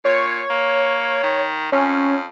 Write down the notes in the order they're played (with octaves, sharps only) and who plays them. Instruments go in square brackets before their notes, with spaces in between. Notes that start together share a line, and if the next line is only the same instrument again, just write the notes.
[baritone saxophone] A#2 [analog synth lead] C#5
[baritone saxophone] A#3
D#3
[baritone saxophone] F2 [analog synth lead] C#4